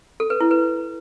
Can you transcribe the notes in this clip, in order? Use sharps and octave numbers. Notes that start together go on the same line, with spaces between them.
A4
B4
E4
B4